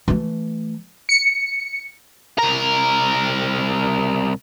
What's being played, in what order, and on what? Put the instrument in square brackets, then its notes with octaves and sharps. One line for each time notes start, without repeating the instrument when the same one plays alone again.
[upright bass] E3 A3
[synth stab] C#7
[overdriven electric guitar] C2 A#4